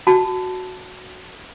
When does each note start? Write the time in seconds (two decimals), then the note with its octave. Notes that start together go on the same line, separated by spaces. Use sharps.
0.07 F#4 A5